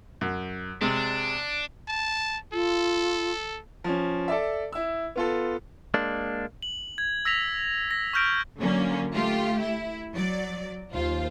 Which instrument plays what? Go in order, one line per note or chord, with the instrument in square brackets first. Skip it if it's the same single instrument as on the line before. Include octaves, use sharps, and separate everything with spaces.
[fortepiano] F#2
[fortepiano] C3 G#3 [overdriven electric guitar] D4
[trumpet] A5
[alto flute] F4 [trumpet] A4
[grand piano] F3 C#4
A4 D5 E5
E4 E6
B3 F4 A4
[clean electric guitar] G#3 A#3 D4
[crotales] F#7
G#6
E6 A#6 B6 F7
A#6
C#6 E6 F6 G6 A#6 D7
[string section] D3 F#3 A#3 C#4
A3 F4 G4
E4
F#3 D5
D#2 F4 C5